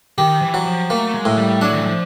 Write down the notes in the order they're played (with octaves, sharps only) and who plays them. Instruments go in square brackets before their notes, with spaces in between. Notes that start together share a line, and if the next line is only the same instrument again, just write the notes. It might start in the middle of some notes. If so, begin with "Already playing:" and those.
[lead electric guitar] D#3 [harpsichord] G4
[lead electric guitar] E3
[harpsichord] F#3
[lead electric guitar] F3
[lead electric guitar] A3 [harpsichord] A#3
[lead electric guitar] A3
G#3
[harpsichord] A2
[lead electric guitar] G3
[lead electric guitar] F#3 [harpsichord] D4
[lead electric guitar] D#3
E3
F3